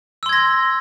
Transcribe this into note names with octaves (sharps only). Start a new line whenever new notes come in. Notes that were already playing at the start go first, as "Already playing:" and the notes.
C6 E6 G#6 A#6